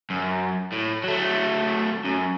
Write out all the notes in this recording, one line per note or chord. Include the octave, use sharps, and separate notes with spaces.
F#2
A2
F#3 A3
F#2